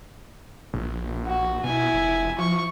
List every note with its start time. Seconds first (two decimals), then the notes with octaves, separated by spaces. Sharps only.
0.74 A#1
1.26 F#4
1.64 B2 E4 G#5
1.94 F1
2.39 F3 C#6